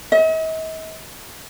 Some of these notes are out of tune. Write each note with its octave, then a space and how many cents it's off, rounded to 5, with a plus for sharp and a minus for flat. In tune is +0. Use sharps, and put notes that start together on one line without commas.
D#5 +45